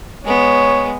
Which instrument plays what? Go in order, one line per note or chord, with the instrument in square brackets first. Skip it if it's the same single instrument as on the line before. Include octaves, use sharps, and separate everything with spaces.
[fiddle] G#3 B3 [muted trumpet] C#5